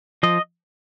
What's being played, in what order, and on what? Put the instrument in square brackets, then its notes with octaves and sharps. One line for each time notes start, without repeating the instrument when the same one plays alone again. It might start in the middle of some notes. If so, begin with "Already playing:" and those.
[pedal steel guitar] F3 D#5